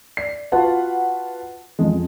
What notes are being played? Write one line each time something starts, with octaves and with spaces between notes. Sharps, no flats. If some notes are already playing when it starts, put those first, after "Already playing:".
D5 C7
F4 F#4 B4 F#5 A5
A1 F2 G#3